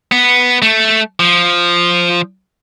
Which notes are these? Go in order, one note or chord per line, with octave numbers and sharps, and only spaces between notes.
B3
A3
F3